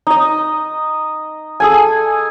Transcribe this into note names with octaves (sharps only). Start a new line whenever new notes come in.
D#4 D#5
G#4 A4 G#5